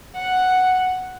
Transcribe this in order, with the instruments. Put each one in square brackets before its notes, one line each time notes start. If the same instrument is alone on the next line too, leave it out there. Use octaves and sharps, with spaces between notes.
[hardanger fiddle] F#5